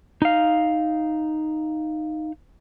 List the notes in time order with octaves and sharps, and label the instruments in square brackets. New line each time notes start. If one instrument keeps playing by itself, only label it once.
[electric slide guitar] D#4 F5